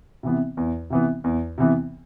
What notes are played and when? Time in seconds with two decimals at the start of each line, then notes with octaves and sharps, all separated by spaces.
0.23 C3 E3 B3
0.57 E2
0.90 C3 E3 B3
1.24 E2
1.58 C3 E3 B3